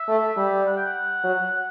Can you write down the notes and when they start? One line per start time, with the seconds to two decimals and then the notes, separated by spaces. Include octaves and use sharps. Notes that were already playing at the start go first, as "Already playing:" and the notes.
Already playing: E5
0.08 A3
0.37 G3
0.66 F#5
0.76 G5
0.86 F#5
1.24 F#3